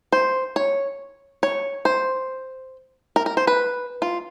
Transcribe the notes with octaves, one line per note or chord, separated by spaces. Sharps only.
C5
C#5
C#5
C5
A#4
A#4
C5
B4
F4